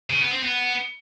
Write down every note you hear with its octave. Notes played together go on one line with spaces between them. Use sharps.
C#3
B3
C4
B3